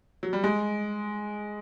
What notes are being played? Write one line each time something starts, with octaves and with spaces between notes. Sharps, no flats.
F#3
G3
G#3